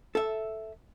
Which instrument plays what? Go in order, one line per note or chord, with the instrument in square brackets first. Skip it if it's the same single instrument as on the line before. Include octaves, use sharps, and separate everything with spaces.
[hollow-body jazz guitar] A4 E5